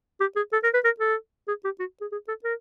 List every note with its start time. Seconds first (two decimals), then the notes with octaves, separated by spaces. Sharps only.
0.21 G4
0.36 G#4
0.53 A4
0.64 A#4
0.74 B4
0.84 A#4
1.00 A4
1.48 G#4
1.65 G4
1.80 F#4
2.01 G#4
2.12 G#4
2.28 A4
2.44 A#4